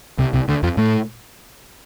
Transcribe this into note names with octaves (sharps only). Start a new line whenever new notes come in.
C2 C3
C2 C3
D2 D3
F2 F3
A2 A3